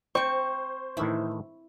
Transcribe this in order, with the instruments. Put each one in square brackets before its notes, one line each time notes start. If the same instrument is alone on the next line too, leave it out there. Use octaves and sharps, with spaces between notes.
[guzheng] C4 G5 [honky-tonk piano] C5 [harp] C#6
[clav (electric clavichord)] A2 D#3 E3 [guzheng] E4